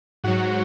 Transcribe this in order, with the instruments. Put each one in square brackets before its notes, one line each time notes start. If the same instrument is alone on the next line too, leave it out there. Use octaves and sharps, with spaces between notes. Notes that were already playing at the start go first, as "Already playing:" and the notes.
[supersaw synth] G#2 F#3 F#4 F#5